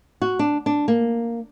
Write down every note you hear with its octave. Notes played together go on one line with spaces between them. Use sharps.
F#4
D4
D4
A#3